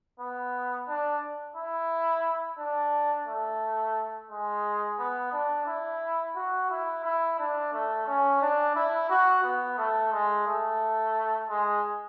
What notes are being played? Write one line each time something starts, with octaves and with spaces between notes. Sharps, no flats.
B3
D4
E4
D4
A3
G#3
B3
D4
E4
F#4
E4
E4
D4
A3
C#4
D4
E4
F#4
B3
A3
G#3
A3
G#3